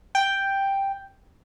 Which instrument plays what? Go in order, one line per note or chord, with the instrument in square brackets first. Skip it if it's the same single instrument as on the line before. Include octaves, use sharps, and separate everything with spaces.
[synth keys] G5